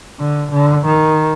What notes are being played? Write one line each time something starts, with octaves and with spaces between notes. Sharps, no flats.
D3
D3
D#3